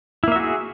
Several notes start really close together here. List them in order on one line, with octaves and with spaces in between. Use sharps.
E4 A#3 E5 F#4 G#4